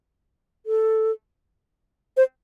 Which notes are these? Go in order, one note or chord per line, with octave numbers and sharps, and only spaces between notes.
A4
C5